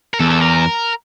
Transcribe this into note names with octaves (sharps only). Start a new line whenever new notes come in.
A#4
E2 A4
A4
A#4